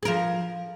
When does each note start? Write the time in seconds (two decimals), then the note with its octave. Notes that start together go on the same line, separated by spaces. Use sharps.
0.03 G#4
0.05 A#4
0.08 F3